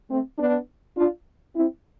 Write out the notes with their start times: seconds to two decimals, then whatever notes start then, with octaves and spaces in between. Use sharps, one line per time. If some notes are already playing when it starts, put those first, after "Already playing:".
0.10 A3 C4
0.38 B3 D4
0.97 D4 F4
1.56 C4 E4